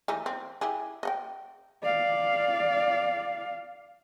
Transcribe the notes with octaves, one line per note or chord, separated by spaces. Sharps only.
E3 A3 D#4
C4
E4 G4 G#4
D#5 F#5 G5
D5 F5